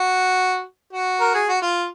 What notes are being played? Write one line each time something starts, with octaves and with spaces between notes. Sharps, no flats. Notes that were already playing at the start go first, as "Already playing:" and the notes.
Already playing: F#4
F#4
A#4
G#4
F#4
F4